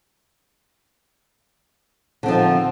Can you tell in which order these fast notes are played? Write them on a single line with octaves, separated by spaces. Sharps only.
D3 C4 F3 D#4